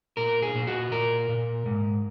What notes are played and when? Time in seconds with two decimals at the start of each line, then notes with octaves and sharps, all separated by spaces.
0.17 A#2 A#4
0.43 G#4
0.55 A#2
0.67 F#4
0.92 A#2 A#4
1.29 A#2
1.66 G#2